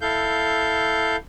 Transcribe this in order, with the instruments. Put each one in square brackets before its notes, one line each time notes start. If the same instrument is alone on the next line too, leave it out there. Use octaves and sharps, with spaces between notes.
[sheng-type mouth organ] E4 A4 F5 G6